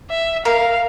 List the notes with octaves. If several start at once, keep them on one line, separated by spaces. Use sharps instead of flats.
E5
A#4 F5